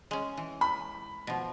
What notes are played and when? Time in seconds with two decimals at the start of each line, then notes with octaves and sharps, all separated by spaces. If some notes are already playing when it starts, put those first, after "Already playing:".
0.11 G#3 C#4
0.37 E3
0.61 B5
1.27 B2 F3